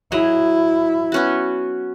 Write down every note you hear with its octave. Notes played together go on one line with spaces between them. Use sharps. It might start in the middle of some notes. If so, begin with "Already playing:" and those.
F#3 E4 G#4 D#5
B3 C#4 F#4